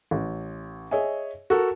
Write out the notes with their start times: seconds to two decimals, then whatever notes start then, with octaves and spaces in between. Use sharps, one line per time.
0.11 A1
0.91 G#4 C#5 D#5 E5 G#5
1.50 F#4 A4 A#4